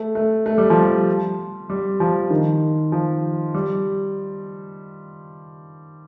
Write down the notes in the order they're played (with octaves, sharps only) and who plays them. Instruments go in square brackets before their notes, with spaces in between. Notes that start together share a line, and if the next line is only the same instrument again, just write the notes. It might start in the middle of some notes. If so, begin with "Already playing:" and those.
Already playing: [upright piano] A3
A3
A3
G3
F3
G3
G3
F3
D#3
F3
G3